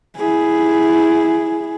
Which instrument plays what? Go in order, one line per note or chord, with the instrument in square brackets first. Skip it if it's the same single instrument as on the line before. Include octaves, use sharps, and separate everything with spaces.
[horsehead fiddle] E4 G#4